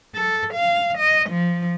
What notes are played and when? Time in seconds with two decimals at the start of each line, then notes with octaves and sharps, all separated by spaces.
0.14 A4
0.53 F5
0.98 D#5
1.30 F3